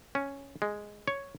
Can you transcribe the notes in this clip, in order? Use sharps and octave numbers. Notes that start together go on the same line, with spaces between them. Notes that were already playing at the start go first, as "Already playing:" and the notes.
C#4
G#3
C#5